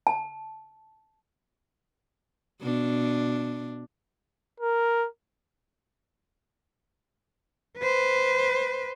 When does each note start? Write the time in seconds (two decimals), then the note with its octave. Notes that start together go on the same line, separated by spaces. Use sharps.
0.07 A5
2.61 B2 D4
4.60 A#4
7.79 B4 C5